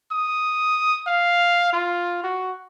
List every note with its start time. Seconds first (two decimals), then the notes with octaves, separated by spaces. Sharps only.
0.12 D#6
1.07 F5
1.73 F4
2.24 F#4